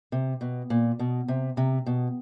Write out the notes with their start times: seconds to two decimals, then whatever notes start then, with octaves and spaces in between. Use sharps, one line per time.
0.12 C3
0.41 B2
0.70 A#2
0.99 B2
1.28 C3
1.57 C3
1.86 B2